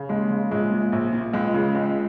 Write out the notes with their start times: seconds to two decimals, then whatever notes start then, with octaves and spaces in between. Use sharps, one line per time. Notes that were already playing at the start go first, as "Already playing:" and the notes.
Already playing: C#3
0.09 D#2 G#3
0.30 C#3
0.51 A#1 G#3
0.72 A#2
0.92 A#1
1.13 A#2
1.33 C#2 G#3
1.54 C#3
1.75 C#2